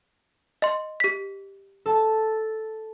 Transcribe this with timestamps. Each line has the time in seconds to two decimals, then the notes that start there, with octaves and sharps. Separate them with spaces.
0.62 D#5 C6
1.00 G4 B6
1.86 A4 A5